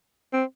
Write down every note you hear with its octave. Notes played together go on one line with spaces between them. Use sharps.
C4